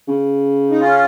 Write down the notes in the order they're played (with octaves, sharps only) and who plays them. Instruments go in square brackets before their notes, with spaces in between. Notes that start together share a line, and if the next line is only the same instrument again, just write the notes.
[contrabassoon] C#3
[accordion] D#4
C#4 F4